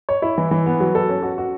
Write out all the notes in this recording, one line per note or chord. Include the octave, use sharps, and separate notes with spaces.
C#5
E4
E3
E3
B3
F#3
A4
C#4
F#4
F#4